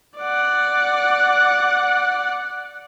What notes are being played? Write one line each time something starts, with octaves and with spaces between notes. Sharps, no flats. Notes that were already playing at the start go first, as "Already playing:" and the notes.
D5 F#5